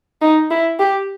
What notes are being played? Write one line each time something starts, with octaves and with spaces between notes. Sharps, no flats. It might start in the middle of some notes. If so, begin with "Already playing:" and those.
D#4
E4
G4